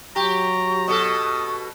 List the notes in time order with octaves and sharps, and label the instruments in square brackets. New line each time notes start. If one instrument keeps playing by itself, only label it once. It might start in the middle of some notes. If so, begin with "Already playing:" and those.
[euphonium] F#3 [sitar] G4 [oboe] A#5 [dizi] C#6
[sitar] B2 A4 [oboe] D#6